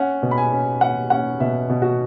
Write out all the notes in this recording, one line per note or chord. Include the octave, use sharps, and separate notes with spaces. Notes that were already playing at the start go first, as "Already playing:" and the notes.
Already playing: C#4 F#5
B2
B5
G#5
C#4
C#4 F#5
C#4 F#5
B2 E5
B2
F#4